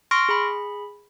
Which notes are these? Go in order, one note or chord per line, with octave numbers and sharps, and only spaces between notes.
C6 C#6 F6 A#6 D7
G#4 B5